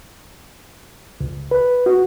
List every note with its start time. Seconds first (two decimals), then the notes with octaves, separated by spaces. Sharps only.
1.21 C#2
1.51 B4
1.86 F#4